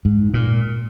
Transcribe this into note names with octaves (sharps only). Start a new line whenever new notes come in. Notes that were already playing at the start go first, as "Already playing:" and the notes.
G#2
A#2